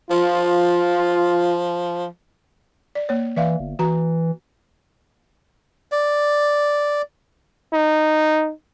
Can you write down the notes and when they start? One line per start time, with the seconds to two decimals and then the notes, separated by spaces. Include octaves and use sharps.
0.11 F3 F4
2.95 D5
3.09 A#3 C#5
3.36 E3 D5 E5 F5
3.60 G1
3.79 E3 F#4 A#5
5.92 D5
7.73 D#4